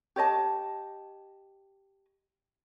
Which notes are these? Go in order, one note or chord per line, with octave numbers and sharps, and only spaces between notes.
G4 C#5 D#5 A5